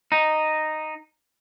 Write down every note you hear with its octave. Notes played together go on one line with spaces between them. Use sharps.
D#4